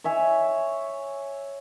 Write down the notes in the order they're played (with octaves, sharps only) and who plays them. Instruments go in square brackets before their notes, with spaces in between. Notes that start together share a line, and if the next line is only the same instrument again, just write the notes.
[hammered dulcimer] C#5 E5 G#5